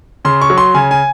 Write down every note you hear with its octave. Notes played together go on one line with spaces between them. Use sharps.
C#3 C6
C#6
F#3
C6
C#3 G#5
G#5